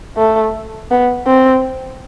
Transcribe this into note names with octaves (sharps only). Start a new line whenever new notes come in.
A3
B3
C4